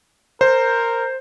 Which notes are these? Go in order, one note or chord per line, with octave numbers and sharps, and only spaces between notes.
A#4 C5